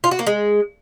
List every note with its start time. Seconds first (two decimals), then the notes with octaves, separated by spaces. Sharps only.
0.04 F4
0.11 F#4
0.19 A#3
0.27 G#3